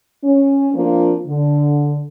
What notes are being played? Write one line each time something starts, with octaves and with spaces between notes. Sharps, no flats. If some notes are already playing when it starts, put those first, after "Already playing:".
C#4
F3 A#3 C4 D4 F4
D3